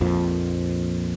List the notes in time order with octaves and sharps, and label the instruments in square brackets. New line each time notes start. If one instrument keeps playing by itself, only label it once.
[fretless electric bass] A#1 F2 A#2 F3